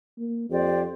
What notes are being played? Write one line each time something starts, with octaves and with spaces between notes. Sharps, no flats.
A#3
F2 G4 C5 D5